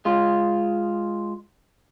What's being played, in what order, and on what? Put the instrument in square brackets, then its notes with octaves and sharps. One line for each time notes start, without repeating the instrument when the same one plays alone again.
[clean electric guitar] G#3 F4